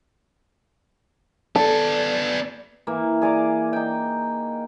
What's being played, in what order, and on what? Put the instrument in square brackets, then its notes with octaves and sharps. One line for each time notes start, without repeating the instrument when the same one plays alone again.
[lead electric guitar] B3 D5 [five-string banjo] A4
[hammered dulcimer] E3 A#3
G#4 D5 A#5 D6
D#4 G5